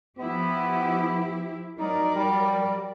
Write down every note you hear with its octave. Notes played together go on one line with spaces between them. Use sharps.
F3 B3 E4 G4
F#3 D#4 A#4 D5
G3